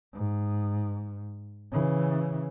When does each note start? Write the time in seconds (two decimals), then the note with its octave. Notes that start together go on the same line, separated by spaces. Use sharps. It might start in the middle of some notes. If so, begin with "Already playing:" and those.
0.13 G#2
1.72 C#3 E3